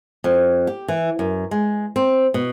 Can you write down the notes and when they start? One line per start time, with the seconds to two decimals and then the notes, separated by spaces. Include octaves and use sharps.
0.24 F2
0.67 G4
0.88 E3
1.19 F#2
1.51 G#3
1.96 C4
2.34 B2